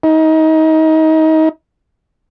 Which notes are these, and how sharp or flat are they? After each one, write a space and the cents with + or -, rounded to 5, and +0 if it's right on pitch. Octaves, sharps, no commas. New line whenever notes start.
D#4 +30